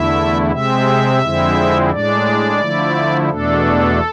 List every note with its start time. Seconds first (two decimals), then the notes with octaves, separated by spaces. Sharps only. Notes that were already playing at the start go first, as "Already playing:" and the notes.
Already playing: E2 D3 A3 E4 E5
0.52 C3 G#3 C4 E5
1.21 F2 D3 G#3 C4 E4
1.91 A2 G#3 D4 D5
2.60 D3 F3 A3 E4
3.30 E2 B2 A3 D4 A4